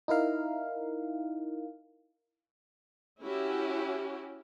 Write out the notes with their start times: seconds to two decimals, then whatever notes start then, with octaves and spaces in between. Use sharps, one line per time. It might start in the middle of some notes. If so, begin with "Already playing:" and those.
0.08 D#4 E4 A#4 F5
3.22 C#4 E4 F#4 G4